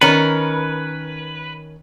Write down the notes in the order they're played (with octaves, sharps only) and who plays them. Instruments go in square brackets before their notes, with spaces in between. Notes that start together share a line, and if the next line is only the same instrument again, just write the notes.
[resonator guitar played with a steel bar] D#3 C#4 A#4 [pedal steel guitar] B4